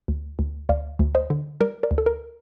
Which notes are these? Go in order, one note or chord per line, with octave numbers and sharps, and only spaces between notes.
D2
D2
D2 D5 F5
D2
C5 D#5
D3
G3 A#4 D5
A#4 D5
D2
A4
A#4